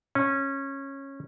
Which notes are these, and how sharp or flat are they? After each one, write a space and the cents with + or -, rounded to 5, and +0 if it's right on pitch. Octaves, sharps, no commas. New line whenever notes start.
C#4 -20